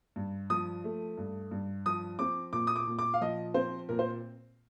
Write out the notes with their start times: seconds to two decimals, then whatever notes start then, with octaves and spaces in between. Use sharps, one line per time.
0.16 G2
0.50 F3 D#6
0.84 A3
1.18 G2
1.51 G2
1.86 F3 D#6
2.19 C4 D6
2.53 A#2 D6
2.67 D#6
2.76 D6
2.87 A#2
2.99 D6
3.14 F5
3.21 F3 D#5
3.54 C4 C5
3.89 A#2 A#4
3.99 C5